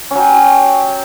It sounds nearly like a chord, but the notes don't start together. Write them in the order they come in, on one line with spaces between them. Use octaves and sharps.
C#4 F#3 G4